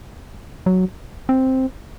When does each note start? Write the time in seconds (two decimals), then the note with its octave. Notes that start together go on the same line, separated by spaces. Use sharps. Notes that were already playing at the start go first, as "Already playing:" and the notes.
0.66 F#3
1.29 C4